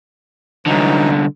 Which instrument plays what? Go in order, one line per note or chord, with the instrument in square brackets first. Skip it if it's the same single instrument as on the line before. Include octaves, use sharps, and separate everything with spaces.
[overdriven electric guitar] C2 D3 [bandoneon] E3 F#3 D#4